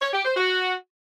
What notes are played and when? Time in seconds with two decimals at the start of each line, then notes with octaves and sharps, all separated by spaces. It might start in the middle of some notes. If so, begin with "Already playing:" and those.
0.02 C#5
0.13 G4
0.25 C5
0.36 F#4